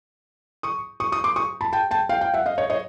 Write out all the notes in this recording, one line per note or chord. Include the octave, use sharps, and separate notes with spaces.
C#6 D#6
C#6 D#6
C#6 D#6
C6 D6
C#6 D#6
A5 B5
G5 A5
G5 A5
F5 G5
F5 G5
E5 F#5
D#5 F5
C#5 D#5
C#5 D#5